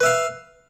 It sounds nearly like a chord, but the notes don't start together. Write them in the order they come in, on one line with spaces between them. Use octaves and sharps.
B4 E5 F5